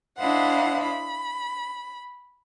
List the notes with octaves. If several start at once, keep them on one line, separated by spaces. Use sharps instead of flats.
D4 E4 C5 D#5 F5 F#5
B5